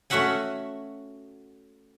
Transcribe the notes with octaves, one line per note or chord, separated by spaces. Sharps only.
A3 C#4 F#4 E5 F#5 G#5